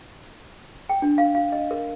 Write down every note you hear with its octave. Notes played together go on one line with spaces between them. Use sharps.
G5
D4
F5
F5
D#5
A#4